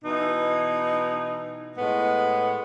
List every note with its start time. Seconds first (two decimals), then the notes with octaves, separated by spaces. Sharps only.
0.04 B2 E3 D#4
1.77 A2 G#3 B3